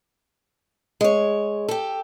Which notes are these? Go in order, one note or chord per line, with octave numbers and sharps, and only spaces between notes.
G#3 C#5
G4 A4